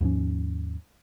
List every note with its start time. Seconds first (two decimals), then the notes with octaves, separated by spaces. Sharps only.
0.01 D#2 G#2 F3 C#4